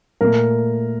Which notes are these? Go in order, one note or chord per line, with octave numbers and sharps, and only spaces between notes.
A#2 A3 A#4